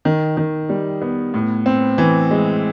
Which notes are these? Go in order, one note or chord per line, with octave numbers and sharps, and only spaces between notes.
D#3
D#3
G3
B3
A2
C4
E3
G#3